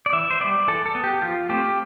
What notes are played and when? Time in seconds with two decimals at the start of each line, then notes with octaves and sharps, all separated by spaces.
0.06 D5
0.13 E3 E5
0.30 C5
0.40 G3 B3 D5
0.67 E3 A4
0.86 A4
0.95 B3
1.04 G4
1.22 F3 F4
1.49 A3 C4 G4